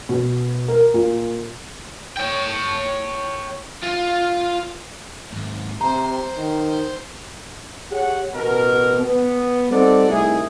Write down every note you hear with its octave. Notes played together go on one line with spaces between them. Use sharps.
B2
A#4
A#2
C#5 G5
F4
D#2 G#2
C3 C5 A#5
D#3
G4 G#4 C#5 F#5
A1 B2 A#4
B3
G3 C4 D#4 A4 D5 F#5
C2 A3 D#4 E4 G#4